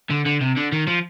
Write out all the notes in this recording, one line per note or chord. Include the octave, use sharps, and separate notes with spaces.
D3
D3
C3
D3
D#3
F3